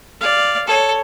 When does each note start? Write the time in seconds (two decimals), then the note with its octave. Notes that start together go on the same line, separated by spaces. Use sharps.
0.21 D5 F5
0.67 A4 C#5